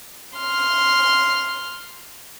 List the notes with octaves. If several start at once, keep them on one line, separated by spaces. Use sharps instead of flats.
C6 F6